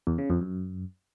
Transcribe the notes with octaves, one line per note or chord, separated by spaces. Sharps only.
E2
C#3
F2
F#2